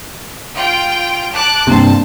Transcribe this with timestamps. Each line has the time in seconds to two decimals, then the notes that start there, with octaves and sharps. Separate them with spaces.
0.55 F4 G5
1.34 A5 D6 F#6
1.67 G2 C3 A#3 D4 C5 A5